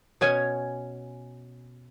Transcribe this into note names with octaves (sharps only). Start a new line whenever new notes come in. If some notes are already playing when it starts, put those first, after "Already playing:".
B2 C#4 G#5